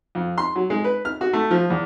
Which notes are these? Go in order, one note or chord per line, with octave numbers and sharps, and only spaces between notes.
F2
C6
F#3
G#3
B4
F6
F#4
A3
F3
E2